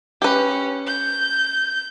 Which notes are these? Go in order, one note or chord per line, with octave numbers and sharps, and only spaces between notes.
C#4 G4 B4
G6